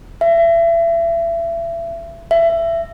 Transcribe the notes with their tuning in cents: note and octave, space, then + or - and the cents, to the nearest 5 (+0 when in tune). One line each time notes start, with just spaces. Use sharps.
E5 +30
E5 +20